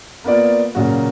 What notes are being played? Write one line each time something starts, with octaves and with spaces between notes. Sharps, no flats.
A#3 B3 F4 D5
A#2 C#3 F#3 F#4